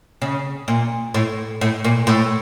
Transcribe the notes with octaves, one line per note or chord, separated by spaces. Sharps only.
C#3
A#2
A2
A2
A#2
A2